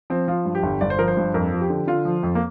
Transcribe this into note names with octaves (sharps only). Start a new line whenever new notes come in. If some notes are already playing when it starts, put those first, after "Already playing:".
F3 C4
F3 F4
G2
G4
G1
G1 D5
C5
F3 A#4
C5
G2
F2 A#4
F3
G4
D3
D3 F4
F3
F2
A#3